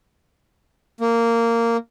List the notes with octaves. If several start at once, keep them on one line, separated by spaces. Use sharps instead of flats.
A#3